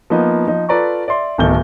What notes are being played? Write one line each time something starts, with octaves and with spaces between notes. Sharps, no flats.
F3 A#3 B3 D#4
F3 D#4
F4 A4 B4 D5 A#5 C#6
D5 E5 C6
D1 B2 D#3 A4 G6 G7